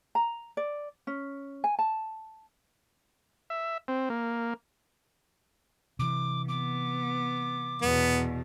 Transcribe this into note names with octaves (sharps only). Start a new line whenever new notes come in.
A#5
D5
C#4
G#5
A5
E5
C4
A#3
C3 E3 D6
B3 D6
E2 B2 B3